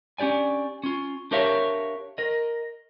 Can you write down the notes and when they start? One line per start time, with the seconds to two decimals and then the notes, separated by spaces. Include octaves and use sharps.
0.18 C#4 D4 G4 D5 G#5
0.83 C#4 F4
1.31 D4 G4 A#4 C#5 E5 F5
2.18 A#4 D#5